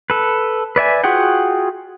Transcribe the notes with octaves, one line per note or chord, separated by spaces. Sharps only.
A4 B4
B4 D5 E5 G#5
F4 F#4 G#4 F#5 G5